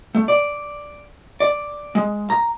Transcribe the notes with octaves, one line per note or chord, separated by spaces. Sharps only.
A3
D5
D5
G#3
A#5